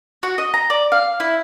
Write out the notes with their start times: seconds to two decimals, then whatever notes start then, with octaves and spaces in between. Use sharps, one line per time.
0.23 F#4
0.38 D#5
0.54 A#5
0.70 D5
0.92 F5
1.20 E4